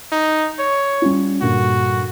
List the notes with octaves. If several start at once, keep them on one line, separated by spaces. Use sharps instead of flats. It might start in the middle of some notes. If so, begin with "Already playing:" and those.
D#4
C#5
G3 C#4 F4
G2 A#2 D3 F#4